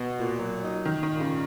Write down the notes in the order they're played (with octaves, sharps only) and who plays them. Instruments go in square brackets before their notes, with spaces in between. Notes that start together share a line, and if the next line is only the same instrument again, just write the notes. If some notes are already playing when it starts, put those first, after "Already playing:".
Already playing: [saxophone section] B2
A#2
F#3
D#4
[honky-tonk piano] D#3 [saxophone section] D#4
[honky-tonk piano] D#3
[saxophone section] A#2
[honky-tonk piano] C#3